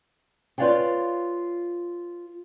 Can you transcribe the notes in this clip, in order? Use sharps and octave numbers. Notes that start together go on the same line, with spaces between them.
F4 B4 C#5 D5 F5 G5